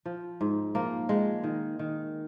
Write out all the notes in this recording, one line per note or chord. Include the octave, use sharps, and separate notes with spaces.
F3
G#2
F3 A#3
F3 G#3
D#3
D#3